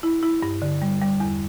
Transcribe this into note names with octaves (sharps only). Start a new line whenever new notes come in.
E4
E4
G2
D3
G3
G3
E2